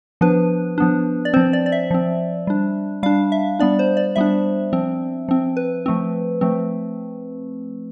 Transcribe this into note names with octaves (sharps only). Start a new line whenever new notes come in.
F3 B3 D4 B4
F3 B3 D4
D5
F3 C4 C5
D5
D5
E5
F3 C4
G3 D4
G3 D4 F5
E5
G3 B3 D4 D5
C5
D5
G3 B3 D4 E5
F3 C4
F3 C4
B4
F3 A3 C4
F3 A3 C4